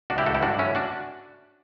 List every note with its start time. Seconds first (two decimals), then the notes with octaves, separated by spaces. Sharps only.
0.10 C#2 D4 F#4
0.18 E4 G4
0.26 C#2 F#4 A4
0.34 E4 G4
0.42 G2 D4 F#4
0.59 A3 C#4 E4
0.75 D4 F#4